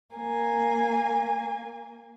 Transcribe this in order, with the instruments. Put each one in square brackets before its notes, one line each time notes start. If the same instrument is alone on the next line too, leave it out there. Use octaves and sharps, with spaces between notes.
[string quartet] A#3 G#5